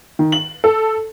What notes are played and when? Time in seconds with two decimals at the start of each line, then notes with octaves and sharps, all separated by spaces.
0.19 D#3
0.32 F#7
0.64 A4